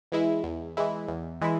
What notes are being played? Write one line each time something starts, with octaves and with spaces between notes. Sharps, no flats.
E3 G#3 E4
E2
E3 G#3 E4
E2
E3 G#3 E4